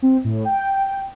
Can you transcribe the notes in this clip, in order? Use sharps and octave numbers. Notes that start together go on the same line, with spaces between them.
C4
A2
G5